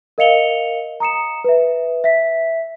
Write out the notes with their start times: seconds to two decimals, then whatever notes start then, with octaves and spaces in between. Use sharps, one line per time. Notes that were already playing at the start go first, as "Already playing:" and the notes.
0.18 A#4 D#5 F5 C#7 F7 G7
1.00 A#5 D#6 C#7 E7
1.44 B4 E5
2.04 E5 B6